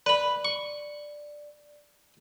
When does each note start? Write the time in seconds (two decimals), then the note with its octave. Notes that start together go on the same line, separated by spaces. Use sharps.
0.06 B4 D5 B5
0.45 C#6